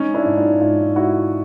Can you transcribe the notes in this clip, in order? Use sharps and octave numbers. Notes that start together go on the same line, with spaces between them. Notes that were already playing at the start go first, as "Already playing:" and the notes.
Already playing: G#3 C#4 D#4
D4 E4
G#2
D#4 F4
G#2 D#4 F4
G#3 E4 F#4